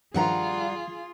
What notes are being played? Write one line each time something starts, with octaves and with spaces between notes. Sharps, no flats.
G2 D#3 F3 G3 F4 G#4 F#5 A#5